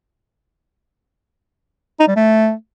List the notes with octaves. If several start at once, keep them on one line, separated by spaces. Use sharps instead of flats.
D#4
G3
A3